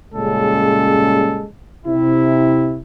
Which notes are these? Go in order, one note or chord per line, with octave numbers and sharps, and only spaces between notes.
A#2 C#3 G3 G#3 C#4 A4
C3 E4